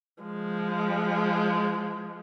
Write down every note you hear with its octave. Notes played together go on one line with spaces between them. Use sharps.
F3 G#3